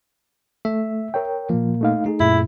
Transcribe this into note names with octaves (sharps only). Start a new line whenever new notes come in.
A3 E5
A#4 C#5 G5
A#2 F3 A#3
A3 D#4 F5
A3 D#4 G#4
F#2 A#2 E4